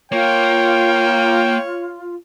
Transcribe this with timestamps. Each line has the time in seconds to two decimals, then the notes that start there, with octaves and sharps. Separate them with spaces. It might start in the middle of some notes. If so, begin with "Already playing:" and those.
0.12 A#3 F4 C#5 G5